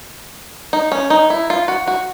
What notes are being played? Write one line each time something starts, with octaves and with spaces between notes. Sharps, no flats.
D#4
C#4
D#4
E4
F4
F#4
F#4